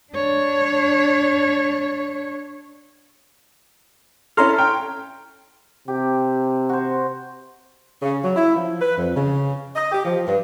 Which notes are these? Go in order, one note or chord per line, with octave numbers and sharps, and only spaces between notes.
D4 C#5
C#4 E4 A4 A#5 C6 F6
G5
C3 G4
F#4 C5
C#3
F#3
E4
F3
B4
F2
C#3
D#5
G4
F3
G2